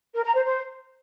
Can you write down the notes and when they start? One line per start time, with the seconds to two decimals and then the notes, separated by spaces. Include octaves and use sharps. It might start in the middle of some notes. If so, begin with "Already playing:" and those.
0.15 A#4
0.25 A#5
0.35 C5
0.45 C5